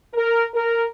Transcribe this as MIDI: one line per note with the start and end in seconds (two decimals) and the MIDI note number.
0.14 0.44 70
0.54 0.84 70